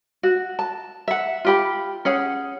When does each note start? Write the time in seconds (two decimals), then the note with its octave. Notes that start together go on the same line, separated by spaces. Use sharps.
0.23 F#4
0.59 A5
1.08 E5 F#5
1.45 F4 G4 B5
2.05 C#4 G#4 F#5